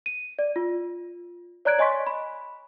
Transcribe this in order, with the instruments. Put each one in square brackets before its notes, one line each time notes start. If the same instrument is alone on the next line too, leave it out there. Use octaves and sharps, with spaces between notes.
[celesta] D#7
D5
F4
C#5 D5 A#5 F#6 G#6 D7
C#5 D#5 G#5 C6 C#6 B6
B5